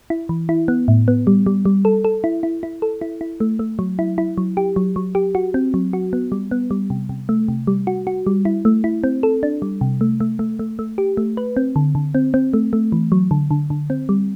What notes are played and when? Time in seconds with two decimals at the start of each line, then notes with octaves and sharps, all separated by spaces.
0.10 E4
0.29 E3
0.49 E4
0.68 B3
0.88 A2
1.08 B3
1.27 G3
1.46 G3
1.65 G3
1.85 A4
2.05 A4
2.24 E4
2.43 E4
2.63 E4
2.82 A4
3.01 E4
3.21 E4
3.40 A3
3.59 A3
3.79 F#3
3.99 E4
4.18 E4
4.38 F#3
4.57 G4
4.76 F#3
4.96 F#3
5.15 G4
5.35 F#4
5.54 C4
5.74 F#3
5.93 F#4
6.13 B3
6.32 G3
6.51 B3
6.71 G3
6.90 C3
7.09 C3
7.29 A3
7.48 C3
7.67 G3
7.87 F#4
8.07 F#4
8.27 G3
8.45 E4
8.65 A3
8.84 E4
9.04 C4
9.23 A4
9.43 D4
9.62 G3
9.81 C3
10.01 A3
10.20 A3
10.39 A3
10.59 A3
10.79 A3
10.98 G4
11.17 A3
11.37 B4
11.57 C4
11.76 D3
11.95 D3
12.15 C4
12.34 C4
12.53 A3
12.73 A3
12.92 E3
13.12 F#3
13.31 D3
13.51 D3
13.70 D3
13.90 C4
14.09 G3